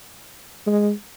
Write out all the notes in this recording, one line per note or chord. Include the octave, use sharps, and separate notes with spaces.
G#3